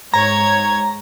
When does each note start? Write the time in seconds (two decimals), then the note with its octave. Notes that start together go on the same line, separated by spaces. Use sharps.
0.14 G#2 C#5 A#5 G#6